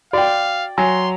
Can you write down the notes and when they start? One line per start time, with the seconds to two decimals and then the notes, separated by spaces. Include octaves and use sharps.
0.13 F#4 D5 F5 G5
0.78 F#3 G#5 C6